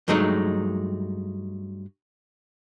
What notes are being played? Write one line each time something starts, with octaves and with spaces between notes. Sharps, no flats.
G2 F#3 G#3 A3 D#4